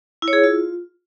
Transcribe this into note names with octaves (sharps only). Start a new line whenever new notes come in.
E4
C#5
G#4
E4
F4